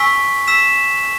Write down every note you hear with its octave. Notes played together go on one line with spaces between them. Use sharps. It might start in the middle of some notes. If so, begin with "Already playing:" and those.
Already playing: G#5 C#6 E6 B6
E6 B6 E7